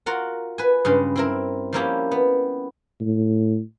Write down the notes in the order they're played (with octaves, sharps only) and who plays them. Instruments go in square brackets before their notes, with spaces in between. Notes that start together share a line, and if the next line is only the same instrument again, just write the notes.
[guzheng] F4 F#4 A#4 F#5 A#5
B4 G#5
G2 C#3 G#3 C#4
C4 E4 A#4
F3 G3 A#3 C#4 E4 G4
B3
[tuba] A2